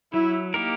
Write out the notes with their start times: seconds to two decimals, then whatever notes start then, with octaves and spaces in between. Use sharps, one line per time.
0.13 F#3 E4
0.54 A#3 D#4 G4 A#4